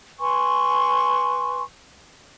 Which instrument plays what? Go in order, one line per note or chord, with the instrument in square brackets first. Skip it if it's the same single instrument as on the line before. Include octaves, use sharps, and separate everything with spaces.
[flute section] B4 G#5 C6 C#6